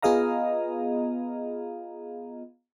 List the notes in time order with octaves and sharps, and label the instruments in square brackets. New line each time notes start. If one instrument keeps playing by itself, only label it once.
[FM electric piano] B3 F4 G#4 D#5 F5 A#5